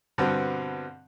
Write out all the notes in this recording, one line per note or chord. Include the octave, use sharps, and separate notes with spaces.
G2 B2 D3 B3 C4